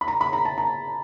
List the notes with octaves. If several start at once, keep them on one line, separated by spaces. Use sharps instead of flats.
B5
A#5
B5
A#5
A5
A#5